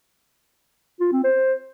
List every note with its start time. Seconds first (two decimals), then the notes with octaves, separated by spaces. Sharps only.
1.00 F4
1.12 C4
1.24 C5